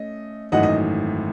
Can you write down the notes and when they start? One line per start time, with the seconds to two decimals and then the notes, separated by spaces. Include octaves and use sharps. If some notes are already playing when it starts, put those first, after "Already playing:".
Already playing: A3 C#4 D#5
0.52 G#1 F#2 E3 A3 D#4 D#5 F#5
0.63 D#5